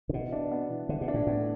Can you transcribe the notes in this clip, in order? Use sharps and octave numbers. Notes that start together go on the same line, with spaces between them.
D3
B2 E3
D4
B3
E3
D3 E3
B2
D4
A2
A2 B3